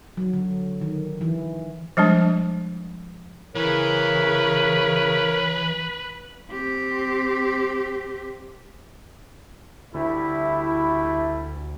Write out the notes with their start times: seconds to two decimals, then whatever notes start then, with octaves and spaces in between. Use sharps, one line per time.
0.17 F#3
0.33 D3
0.81 D#3
1.21 E3
1.97 F3 G3 G#3 D4
3.56 C#3 E3 A#4 B4 C#5
6.51 C4 G4
9.94 D2 G3 A3 E4